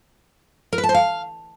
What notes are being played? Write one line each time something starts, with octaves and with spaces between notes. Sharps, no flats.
A#4
B4
A5
C5
F5